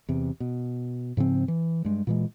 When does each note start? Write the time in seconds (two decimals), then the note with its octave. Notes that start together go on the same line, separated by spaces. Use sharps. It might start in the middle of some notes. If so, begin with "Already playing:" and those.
0.09 E2 C3
0.40 B2
1.17 G#2 C#3 F3 C4
1.48 E3
1.85 G2 G#3
2.07 A#2 E3 G#3